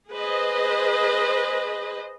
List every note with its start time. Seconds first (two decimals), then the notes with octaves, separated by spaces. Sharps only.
0.11 G#4 B4 C5 D#5